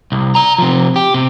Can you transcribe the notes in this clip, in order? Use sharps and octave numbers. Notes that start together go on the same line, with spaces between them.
C2
D5 A#5
C3 F3
G4
C3